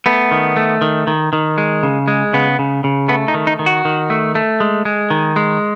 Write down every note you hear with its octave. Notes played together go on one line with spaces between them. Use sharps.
A3 B3
D#3
A3
D#3
D#3
D#3
G#3
C#3
G#3
C#3 B3
C#3
C#3
A3 B3
D#4
D#3
D#4
D#3
F#4
D#3
A3
A3
G#3
G#3
D#3
G#3